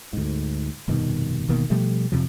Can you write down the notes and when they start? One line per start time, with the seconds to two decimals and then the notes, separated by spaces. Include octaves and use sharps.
0.13 D2 G#2
0.88 F1 G2 B2 D#3
1.48 G1 B2 D#3 A#3
1.70 B2 F3 G3 A3
2.12 F2 C3 F3